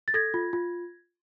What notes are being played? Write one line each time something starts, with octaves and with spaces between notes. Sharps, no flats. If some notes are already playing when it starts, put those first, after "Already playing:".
A6
A4 G#6 A#6
F4
F4